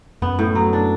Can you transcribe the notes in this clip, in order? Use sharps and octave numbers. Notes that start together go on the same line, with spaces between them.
F#2 B3
A2
F#3
D4